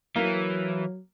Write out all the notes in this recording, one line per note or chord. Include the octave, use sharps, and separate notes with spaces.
E3 F#3 A#3